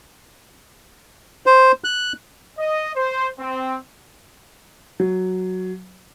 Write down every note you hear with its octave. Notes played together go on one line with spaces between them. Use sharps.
C5
F#6
D#5
C5
C4
F#3